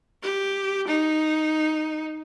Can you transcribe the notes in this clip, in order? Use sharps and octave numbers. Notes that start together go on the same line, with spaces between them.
G4
D#4